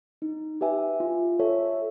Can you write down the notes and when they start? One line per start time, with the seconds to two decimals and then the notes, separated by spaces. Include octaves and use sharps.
0.22 D#4
0.61 G4 B4 E5 G#5
1.00 F4
1.39 A4 C#5 E5